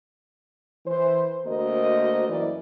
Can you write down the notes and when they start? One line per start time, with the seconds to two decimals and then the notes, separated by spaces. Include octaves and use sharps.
0.86 E3 C5
1.46 D2 A#3 F#4 A#4 C5 D#5
2.28 F#2 E3 F#3 E4 A#4 D5